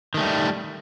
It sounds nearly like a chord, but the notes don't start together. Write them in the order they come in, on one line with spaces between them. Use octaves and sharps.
D#3 A3 G3